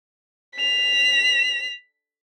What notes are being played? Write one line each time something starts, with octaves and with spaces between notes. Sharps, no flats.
B6 F7